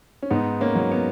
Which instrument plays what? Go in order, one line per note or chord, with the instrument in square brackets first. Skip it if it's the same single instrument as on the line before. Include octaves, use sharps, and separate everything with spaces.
[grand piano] C#4
G#2 B3 D#4
A#3 C#4
F#3
B3